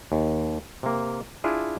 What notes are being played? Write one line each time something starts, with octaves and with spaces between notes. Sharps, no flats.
D#2
C3 A#3
D4 E4 F4 G#4